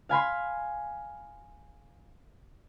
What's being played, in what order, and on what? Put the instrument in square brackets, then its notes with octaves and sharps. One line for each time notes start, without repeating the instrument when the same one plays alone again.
[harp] F5 G#5 B5 C6